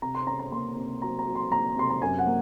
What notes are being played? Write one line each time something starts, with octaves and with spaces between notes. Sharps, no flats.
C3 A#5
C6
C#4 A#5
A#5
A#3 C6
C3
F#3 A#5
A#5
F#3
C6
A#3 A#5
C3 C6
A#5
F#2 G#5
F#5
A#3